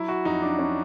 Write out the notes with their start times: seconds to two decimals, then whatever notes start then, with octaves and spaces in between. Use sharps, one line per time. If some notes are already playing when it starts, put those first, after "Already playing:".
Already playing: F#3 E4
0.08 F#4
0.25 F2 D#4
0.42 D4
0.59 C#4